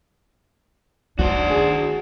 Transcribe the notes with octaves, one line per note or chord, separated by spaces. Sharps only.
D4 E4 F#4 C5
G#4